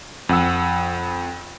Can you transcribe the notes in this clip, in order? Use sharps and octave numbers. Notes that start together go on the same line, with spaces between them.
F2 F#5 E6